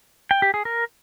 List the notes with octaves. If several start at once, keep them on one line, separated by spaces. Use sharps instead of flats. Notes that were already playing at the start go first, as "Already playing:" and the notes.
G5
G4
G#4
A#4